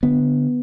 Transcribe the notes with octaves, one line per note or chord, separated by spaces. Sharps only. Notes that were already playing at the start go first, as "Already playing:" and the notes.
D3 B3